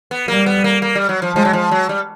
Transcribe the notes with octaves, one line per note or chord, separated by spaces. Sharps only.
B3
G3 A#3
B3
A#3
A#3
G3
F#3
F3
F3 G#3
F#3
F3
F#3
G3